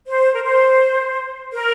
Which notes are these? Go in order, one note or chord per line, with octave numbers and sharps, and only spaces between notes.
C5
A#4
C5
A#4